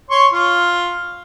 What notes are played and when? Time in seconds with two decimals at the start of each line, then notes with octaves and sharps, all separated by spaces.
0.10 C#5 C6 C#6
0.32 F4